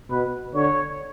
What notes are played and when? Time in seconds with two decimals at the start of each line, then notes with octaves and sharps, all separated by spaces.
0.10 B2 B4
0.54 D3 C#5